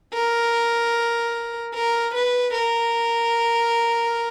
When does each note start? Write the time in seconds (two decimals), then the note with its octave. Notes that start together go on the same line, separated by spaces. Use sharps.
0.14 A#4
1.75 A#4
2.15 B4
2.54 A#4